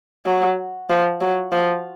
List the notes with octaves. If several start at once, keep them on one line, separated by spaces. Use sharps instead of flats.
F#3
F3
F#3
F3